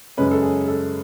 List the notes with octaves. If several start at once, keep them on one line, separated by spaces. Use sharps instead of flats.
F#2 C#3 G#3 C#4 B4
A4
G#4
A4